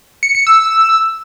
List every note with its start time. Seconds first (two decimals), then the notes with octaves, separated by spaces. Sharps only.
0.23 C#7
0.35 C#7
0.47 E6